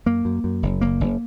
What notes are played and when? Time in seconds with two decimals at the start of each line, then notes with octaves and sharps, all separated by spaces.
0.06 F#2 A#3
0.25 F#2
0.44 F#2
0.63 F#1
0.81 F#1 A#3
1.00 F#1